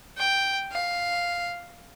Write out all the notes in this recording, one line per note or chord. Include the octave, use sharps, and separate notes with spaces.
G5
F5